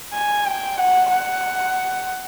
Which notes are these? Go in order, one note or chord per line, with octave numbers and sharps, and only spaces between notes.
G#5
G5
F#5
F#5